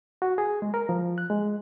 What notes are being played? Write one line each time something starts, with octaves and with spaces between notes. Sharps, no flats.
F#4
G#4
G#3
A#4
F3
F#6
G#3